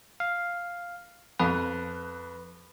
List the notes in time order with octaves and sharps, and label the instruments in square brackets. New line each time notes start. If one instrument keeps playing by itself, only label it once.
[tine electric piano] F5
[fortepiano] F2 [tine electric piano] B4